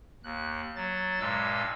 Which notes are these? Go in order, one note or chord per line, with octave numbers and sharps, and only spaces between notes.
D#2 F#6
F#3 A6
G2 A#2 G#3 E6